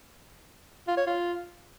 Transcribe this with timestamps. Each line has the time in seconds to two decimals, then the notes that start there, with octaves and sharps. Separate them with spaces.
0.88 F4
0.97 C#5
1.07 F4